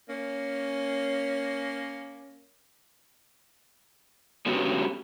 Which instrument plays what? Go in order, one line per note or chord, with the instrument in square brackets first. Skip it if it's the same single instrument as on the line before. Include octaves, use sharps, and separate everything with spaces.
[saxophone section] A#3 C#4
[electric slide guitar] D3 G#3 B3 C#4 F#4 G4